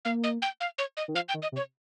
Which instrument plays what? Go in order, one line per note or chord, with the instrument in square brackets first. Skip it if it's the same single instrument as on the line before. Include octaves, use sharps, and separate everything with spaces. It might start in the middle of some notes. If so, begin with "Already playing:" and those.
[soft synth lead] A#3 [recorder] F5
[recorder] D#5
G5
F5
C#5
D#5
[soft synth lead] D#3
[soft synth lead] F3 [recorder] F5
[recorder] G5
[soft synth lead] D#3
[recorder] D#5
[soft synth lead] C3
[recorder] C#5